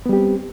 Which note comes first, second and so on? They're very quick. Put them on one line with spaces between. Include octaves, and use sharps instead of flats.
B3 G3 G4 C4